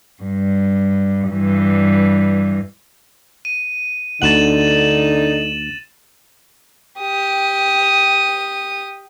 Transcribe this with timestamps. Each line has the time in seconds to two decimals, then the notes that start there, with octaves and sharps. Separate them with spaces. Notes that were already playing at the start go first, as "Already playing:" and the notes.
0.23 G2
1.30 G2 E3
3.45 D#7
4.22 D2 D3 D#4 F#5 A6 E7 F#7
7.01 G4 D#6